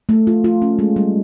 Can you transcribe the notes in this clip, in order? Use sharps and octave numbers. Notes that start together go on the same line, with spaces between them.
A3
F4
F4
C#4
G#3
G3